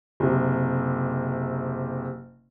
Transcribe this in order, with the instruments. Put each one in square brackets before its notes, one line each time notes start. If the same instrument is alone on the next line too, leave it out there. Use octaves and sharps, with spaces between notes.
[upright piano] F#1 C3